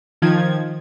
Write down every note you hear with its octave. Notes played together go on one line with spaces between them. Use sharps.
D#3 F3 G#6